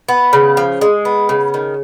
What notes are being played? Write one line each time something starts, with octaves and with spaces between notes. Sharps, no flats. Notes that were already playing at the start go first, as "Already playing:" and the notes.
B3
C#3
F3
G#3
B3
C#3
D#3